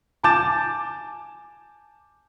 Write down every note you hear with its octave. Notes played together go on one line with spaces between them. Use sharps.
G#5 A5 D6 G6 A6 E7